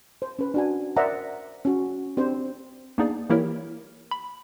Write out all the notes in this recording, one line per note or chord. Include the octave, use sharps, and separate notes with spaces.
C5
C#4 B4
D4 F#4 G#5
A#4 C5 D5 E5 F#5 A#5
C#4 F#4
C4 D4 G4 C5
A#3 B3 D4 D#4 G#4 D5
E3 A#3 E4 G4 A#4 C#5
B5